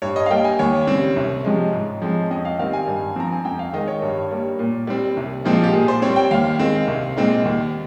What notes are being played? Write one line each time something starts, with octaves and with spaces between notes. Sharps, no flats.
G2 C#5
D#5
F5
G3 A#3 G5
G#5
D#2 C#5
C#3 G3 C4
C2
C3 F3 G#3
G#2
F3 G#3 C4
F2 D#5
F5
D#3 G3 C4 F5
G#5
G2
F3 C4 A#5
G#5
F2 G5
F5
D#3 G#3 D#5
C#5
G2
G3 A#3
A#2
G3 C4
C2
A#2 F3 G#3 C4
F4
G4
A#2 G#4
C5
G3 C4 C#5
G5
D#2 F5
D#3 G#3 C4
C2
A#2 G#3 C4
D#2